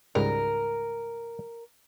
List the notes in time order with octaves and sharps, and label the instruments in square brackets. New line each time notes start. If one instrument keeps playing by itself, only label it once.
[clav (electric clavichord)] C#2 G#2 G3 [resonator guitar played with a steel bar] A#4